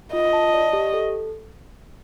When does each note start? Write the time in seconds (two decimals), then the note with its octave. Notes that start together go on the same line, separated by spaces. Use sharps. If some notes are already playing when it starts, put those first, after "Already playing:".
0.13 F4 D#5
0.33 A5
0.54 D5
0.73 G4
0.94 A4